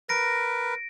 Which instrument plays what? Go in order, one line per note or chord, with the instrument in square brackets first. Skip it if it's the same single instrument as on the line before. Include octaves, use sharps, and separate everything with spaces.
[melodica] A#4 B4 [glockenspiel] A#6 D7